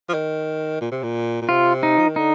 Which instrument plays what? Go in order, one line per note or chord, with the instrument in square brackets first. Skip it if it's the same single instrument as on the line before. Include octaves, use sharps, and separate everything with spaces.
[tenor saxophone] F3
D#3
A#2
C3
A#2
A#2
[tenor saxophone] C3 [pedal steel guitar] F4
[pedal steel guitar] D#4
[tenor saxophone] F3
D#3
[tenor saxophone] D3 [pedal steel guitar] D#4